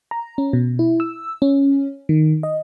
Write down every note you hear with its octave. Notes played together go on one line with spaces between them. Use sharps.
A#5
C#4
B2
E4
E6
C#4
D#3
D#5